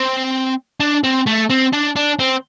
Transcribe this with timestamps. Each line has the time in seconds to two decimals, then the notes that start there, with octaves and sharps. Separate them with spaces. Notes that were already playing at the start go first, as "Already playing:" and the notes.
Already playing: C4
0.80 D4
1.04 C4
1.26 A3
1.50 C4
1.73 D4
1.96 D4
2.19 C4